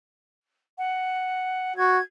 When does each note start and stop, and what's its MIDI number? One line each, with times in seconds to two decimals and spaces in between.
0.78 1.75 78
1.76 1.99 66
1.76 2.02 92